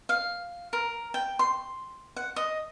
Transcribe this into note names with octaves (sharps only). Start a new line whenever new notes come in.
F5
A#4
G5
C6
F#5
D#5